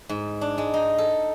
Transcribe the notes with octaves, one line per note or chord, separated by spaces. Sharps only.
G#2
D4
G#3
D#4
A4